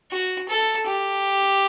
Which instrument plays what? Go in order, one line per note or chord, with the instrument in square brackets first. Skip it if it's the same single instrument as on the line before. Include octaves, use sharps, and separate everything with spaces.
[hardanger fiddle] F#4
A4
G4